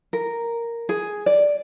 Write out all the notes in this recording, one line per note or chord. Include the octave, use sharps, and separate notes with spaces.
A#4
G#4
D5